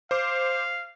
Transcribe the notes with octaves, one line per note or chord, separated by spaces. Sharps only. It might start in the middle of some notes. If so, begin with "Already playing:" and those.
C5 F5 D6